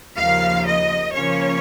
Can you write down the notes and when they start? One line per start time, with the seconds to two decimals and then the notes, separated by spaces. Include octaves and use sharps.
0.16 D#2 C#3 F3 A#3 F5
0.65 D#5
1.14 C#3 F3 A#3 C#4 C#5